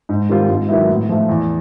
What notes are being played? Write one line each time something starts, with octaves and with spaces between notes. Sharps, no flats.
G#2
D#3 G3 C4 F4
G#2
D#3 F#3 B3 E4
A2
F3 A3
E2